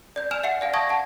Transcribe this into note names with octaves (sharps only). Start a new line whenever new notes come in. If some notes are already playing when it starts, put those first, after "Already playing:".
D5 G6
G#5 F6 E7 F7
E5 F#5 C#7
D5 F5 G#5
A5 C#6 D#6 G#6 A#6
F#5 A5